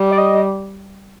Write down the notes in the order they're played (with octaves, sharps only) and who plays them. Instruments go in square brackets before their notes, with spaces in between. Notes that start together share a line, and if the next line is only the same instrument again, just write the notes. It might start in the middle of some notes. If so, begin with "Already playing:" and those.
Already playing: [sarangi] G3
[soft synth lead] D5
D#5